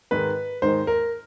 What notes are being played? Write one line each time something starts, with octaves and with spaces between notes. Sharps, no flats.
G#2 D#3 G#3 B4
G#2 D#3 G#3 C5
A#4